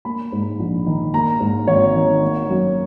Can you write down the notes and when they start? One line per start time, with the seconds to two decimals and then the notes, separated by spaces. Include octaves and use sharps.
0.05 A#3 B5
0.32 G#2
0.59 A#1
0.86 D#3
1.14 A#3 A#5
1.40 G#2
1.67 G#1 C#5
1.95 D#3
2.22 A#3
2.49 F#2